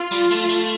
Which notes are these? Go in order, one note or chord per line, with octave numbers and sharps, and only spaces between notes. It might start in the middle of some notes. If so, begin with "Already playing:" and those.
Already playing: F4
G3
A3
A3